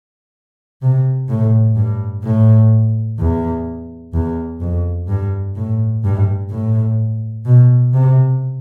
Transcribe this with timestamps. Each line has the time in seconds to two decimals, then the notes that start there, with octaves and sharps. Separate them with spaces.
0.82 C3
1.28 A2
1.76 G2
2.24 A2
3.19 E2
4.14 E2
4.61 F2
5.08 G2
5.56 A2
6.04 G2
6.50 A2
7.45 B2
7.93 C3